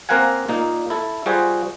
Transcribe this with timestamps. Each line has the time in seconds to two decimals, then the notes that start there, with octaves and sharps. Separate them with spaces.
0.09 A#3 C4 A#4 F5 F#5 G#5
0.49 A#2 A#3 D#4
0.90 E4 A4
1.26 G3 F4 F#4 G#4 C5